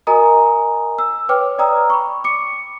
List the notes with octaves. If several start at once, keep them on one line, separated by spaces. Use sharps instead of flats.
F#4 A#4 D#5 G#5 A#5 D#6
E6
B4 C#5 G5 D6 F6
D5 G5 A#5 D#6 E6
B5 C#6
D6 C#7